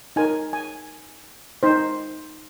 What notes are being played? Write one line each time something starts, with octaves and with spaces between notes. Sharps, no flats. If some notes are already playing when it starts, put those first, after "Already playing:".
D#4 A#4 G#5
G#5
D#4 C5